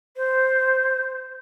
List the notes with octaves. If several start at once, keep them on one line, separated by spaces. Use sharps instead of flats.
C5